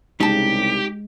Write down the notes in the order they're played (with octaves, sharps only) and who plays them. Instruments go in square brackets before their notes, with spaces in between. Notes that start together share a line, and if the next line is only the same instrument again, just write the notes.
[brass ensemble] C2 C#3 [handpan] G#3 [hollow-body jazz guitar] D#4 A5 [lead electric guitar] G4